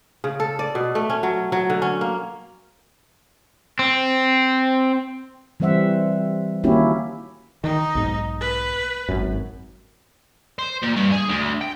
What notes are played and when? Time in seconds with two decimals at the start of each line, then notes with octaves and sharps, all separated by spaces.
0.24 C#3
0.40 A4
0.59 D5
0.75 B2
0.95 A3
1.10 C#4
1.23 F#3
1.52 F#3
1.70 D3
1.82 C#4
2.01 A#3
3.79 C4
5.60 E3 G3 C4 C5 E5 F#5
6.64 D#3 A#3 C#4 E4 F#4 G4
7.64 D#3 D#4
7.95 B1 G#2
8.41 B4
9.09 G#1 F#2
10.59 C5
10.83 A#2
10.97 G2
11.12 G#4
11.29 D2
11.61 G5